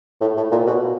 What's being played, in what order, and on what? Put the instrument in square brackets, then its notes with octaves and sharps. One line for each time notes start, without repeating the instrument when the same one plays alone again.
[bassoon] A2
A2
A#2
B2